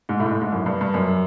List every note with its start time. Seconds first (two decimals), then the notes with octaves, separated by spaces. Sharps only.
0.09 G#2
0.20 A2
0.26 G#2
0.30 A2
0.41 G#2
0.52 F#2
0.66 G2
0.81 G2
0.94 F#2